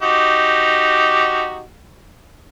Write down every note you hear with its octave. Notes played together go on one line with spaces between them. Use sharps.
D#4 F#4 G4